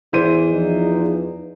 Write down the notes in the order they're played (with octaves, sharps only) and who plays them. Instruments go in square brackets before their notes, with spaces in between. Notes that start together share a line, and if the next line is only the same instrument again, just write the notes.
[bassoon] E2 [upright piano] E3 C5 D#7
[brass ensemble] F3 D#4